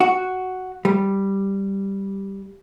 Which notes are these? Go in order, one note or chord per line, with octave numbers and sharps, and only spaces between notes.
F#4
G3